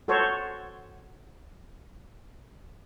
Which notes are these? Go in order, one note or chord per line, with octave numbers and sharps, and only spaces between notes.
F#4 A4 C5 C#5